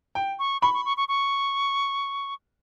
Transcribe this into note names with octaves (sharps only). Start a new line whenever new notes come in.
G5
C#6
B5 C#6
C#6
C#6
C#6
C#6